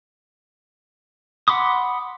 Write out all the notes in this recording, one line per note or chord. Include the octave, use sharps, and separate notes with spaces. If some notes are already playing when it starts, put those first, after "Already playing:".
F#5 B5 C6 D6 D#6